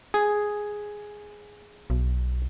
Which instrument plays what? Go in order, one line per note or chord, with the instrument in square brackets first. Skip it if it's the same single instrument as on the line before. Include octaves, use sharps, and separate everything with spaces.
[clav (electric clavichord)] G#4
[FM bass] B1